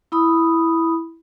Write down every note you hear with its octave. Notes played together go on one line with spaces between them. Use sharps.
E4 B5 D#6